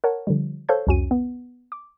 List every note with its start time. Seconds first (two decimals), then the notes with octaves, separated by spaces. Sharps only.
0.04 A#4 C#5 F#5 A5
0.27 D3 F3 G3
0.69 A4 C5 C#5 F5 A5 G6
0.87 C2 F2 C#4 F#4 D#7
1.11 B3
1.72 D6